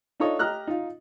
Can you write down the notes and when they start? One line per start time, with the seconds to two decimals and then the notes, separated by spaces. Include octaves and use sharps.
0.20 D4 D#4 F4 A4 C#5 D#5
0.39 G4 D#5 A#5 F6 F#6
0.67 D#4 F4